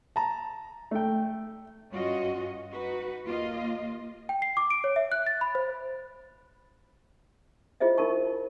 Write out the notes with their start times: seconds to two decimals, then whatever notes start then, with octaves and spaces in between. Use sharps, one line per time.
0.16 A5 A#5
0.91 A3 G5
1.92 G2 C#4 F4 F#4 D#5
2.72 D#4 F#4 B4
3.25 D#2 A#3 F4 D#5
4.29 G5
4.42 C7
4.57 D6
4.70 D7
4.84 C#5
4.96 E5
5.12 F#6
5.27 A6
5.41 B5
5.55 C5
7.80 E4 F4 G#4 C5 D#5 E5
7.98 D#4 E4 A#4 A5 C#6